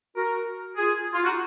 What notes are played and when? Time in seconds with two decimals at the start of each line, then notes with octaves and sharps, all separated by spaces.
0.16 F#4 A#4
0.76 F4 G#4
1.13 F4
1.24 D#4 F#4